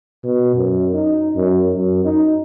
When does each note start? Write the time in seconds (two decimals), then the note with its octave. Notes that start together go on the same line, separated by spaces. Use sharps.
0.24 B2
0.56 F#2
0.94 D#4
1.36 F#2
1.75 F#2
2.05 D#4